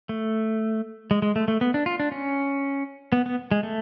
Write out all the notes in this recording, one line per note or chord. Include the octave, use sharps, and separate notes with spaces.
A3
G#3
G#3
A3
A3
B3
D4
F4
D4
C#4
B3
B3
G#3
A3